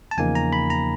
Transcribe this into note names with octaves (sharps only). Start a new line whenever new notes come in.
A5
E2 C#3 F3 A#3 D#4 G#5
A#5
B5
A#5